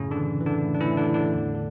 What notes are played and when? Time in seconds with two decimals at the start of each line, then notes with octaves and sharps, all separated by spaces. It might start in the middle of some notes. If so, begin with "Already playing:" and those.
Already playing: F#2 A2 C#3 C#4
0.11 D3 D4
0.17 E3
0.41 E3
0.46 D3 D4
0.63 A2
0.74 D4
0.80 E3 E4
0.86 A2
0.97 D3 D4
1.09 A2
1.14 D3 D4
1.33 E2
1.54 D3